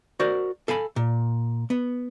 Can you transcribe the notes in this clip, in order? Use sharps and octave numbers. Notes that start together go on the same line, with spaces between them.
F#4 A#4 C5 D5
A4 F5 G#5 B5
A#2
B3